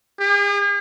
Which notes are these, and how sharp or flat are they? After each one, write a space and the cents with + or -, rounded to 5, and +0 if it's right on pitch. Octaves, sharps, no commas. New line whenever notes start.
G#4 -45